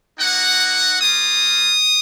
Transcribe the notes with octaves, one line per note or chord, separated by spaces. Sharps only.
A#3 D#4 F#4 F#5
A#3 F4 D#6